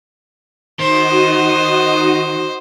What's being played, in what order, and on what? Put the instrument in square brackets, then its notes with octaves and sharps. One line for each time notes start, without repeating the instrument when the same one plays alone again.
[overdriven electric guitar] D#3 [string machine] D#4 F#4 D#6 [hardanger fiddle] C5